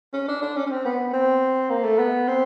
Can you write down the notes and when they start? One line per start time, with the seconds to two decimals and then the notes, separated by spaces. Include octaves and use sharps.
0.14 C#4
0.28 D4
0.42 D4
0.56 C#4
0.66 C#4
0.71 C4
0.85 B3
1.13 C4
1.70 A#3
1.84 A3
1.99 B3
2.28 C4